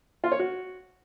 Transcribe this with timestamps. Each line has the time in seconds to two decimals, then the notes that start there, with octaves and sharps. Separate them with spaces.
0.24 F4
0.31 C#5
0.39 F#4